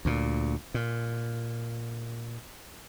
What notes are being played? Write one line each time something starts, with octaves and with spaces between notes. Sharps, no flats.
D2 A#2
A#2